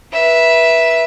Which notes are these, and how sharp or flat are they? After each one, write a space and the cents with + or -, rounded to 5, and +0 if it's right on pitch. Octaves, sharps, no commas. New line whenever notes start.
B4 -30 E5 +0